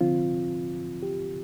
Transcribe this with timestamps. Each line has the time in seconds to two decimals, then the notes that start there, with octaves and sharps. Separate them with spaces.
0.01 D3 F3 C4 F4
1.03 G4